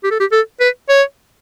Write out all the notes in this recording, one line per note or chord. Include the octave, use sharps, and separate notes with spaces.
G4
A4
G4
A4
B4
C#5